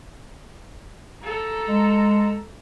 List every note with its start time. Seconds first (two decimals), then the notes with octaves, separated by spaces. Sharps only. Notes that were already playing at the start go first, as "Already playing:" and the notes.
1.23 A4 A#5
1.68 G#3